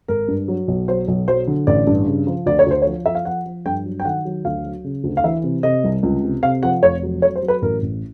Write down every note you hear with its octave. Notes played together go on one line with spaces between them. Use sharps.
G#1 A#4
G2
F#3
B1
F#3 C5
B1
F#3 C5
D3
A1 D5
G2
C#3
F3
D2 D5
C#5
D2 C5
F3 C#5
F3 E5
F5
F3 F#5
F3
G2 G5
F#3
G5
D#3 F#5
F#3
D2 F5
F#3
C#3
D2
F5
E3 E5
C3
C3 D#5
C2
C#2
C3
C3 F5
F3 F#5
F1 C#5
F#3
F#3 C#5
C5
F#3
B4
A1 A#4
A1